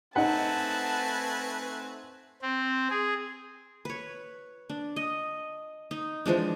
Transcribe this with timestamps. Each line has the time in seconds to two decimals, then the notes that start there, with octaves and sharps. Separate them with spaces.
0.16 A3 C4 D#4 B4 D#5 F#5 G#5 A5
2.42 C4
2.90 G#4
3.85 B4 C#5
4.70 D4
4.96 D#5
5.91 D#4
6.26 E3 F3 G#3 D4